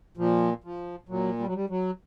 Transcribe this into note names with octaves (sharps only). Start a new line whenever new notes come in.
A#2 F3
F3
A#2 F#3
G3
F#3
G3
F#3